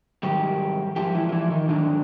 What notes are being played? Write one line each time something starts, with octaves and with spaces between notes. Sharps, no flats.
G#2 D#3 F#3 G3 G4
G#2 F3 G4
E3 E4
F4
E3 E4
D#3 D#4
G#2 D3 D#3 F#3 D4